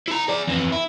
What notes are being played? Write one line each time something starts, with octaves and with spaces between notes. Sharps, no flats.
E4 A#5
G#4 D5
F2 E3
E4